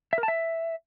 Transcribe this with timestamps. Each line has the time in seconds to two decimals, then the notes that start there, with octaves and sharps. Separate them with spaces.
0.13 E5
0.18 A#4
0.23 A5
0.28 E5